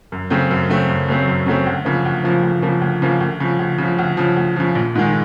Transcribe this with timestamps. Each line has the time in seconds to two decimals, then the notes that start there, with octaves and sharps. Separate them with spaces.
0.12 F#2
0.30 C#3 F#3 A3 C4
0.51 F#2
0.69 C#3 F#3 A3 C4
0.88 F#2
1.08 C#3 F#3 A3 C4
1.28 F#2
1.46 C#3 F#3 A3 C4
1.67 D2
1.85 C#3 F3 A#3
2.05 D2
2.24 C#3 F3 A#3
2.43 D2
2.62 C#3 F3 A#3
2.82 D2
3.02 C#3 F3 A#3
3.21 D2
3.40 C#3 F3
3.59 D2
3.78 C#3 F3
3.99 D2
4.17 C#3 F3
4.37 D2
4.56 C#3 F3
4.75 A#1
4.95 G#2 D#3 G#3